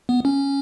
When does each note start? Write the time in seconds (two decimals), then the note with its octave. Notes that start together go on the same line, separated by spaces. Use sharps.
0.09 B3
0.25 C#4